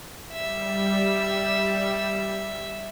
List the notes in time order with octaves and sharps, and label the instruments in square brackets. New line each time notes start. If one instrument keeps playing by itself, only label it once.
[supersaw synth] G3 [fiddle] E5